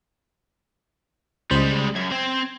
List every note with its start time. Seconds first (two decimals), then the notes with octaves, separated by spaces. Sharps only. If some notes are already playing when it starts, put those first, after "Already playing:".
1.51 C#2 G3 G#3 C5
1.96 F#2 G#6
2.12 C4 C5